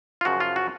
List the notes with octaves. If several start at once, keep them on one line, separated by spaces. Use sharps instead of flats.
F4
F#2 C#3 F3 F#4
F4
F#4